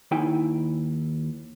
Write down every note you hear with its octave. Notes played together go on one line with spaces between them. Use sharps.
D#2 D#4 E4 G5 G#5 B5